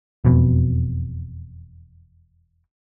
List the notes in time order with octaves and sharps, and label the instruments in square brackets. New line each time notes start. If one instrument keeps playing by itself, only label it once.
[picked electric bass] E1 F2 B2